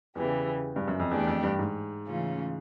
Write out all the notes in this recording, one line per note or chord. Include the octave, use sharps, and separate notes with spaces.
E2 C#3 E3 G3
G2
F#2
F2
E2 E3 A3 D4 G4
F2
G2
G#2
C#3 E3 A3 C#4 F4